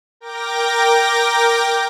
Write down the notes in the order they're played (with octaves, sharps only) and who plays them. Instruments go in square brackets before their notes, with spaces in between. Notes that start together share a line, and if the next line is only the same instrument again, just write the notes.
[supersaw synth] A#4 G5 D6 A#6